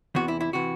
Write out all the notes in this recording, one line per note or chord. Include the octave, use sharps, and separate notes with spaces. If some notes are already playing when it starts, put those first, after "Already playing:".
E2 C3 E3 F#4
E4
E4
C3 E3 F#4